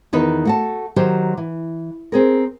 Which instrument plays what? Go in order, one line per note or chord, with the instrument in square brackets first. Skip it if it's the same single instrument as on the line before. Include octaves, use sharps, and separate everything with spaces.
[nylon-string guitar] E2 D#3 D#4 B4
A3 F#4 A5
D#3 F#3 G4 C5
E3
C4 G#4 A#4